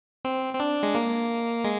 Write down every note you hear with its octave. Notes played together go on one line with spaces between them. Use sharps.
C4
C4
D4
G#3
A#3
G#3